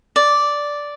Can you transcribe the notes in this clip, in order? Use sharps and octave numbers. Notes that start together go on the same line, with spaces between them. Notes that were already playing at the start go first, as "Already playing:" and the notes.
D5